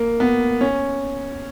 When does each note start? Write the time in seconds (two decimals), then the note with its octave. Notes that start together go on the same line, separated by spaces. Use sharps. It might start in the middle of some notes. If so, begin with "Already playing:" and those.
Already playing: A#3
0.20 B3
0.61 C#4